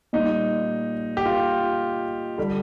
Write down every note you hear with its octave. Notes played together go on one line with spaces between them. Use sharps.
A#2 G3 D#4
G4
F4
D3 G3